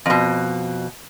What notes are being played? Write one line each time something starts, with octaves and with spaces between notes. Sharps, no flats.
F2 B2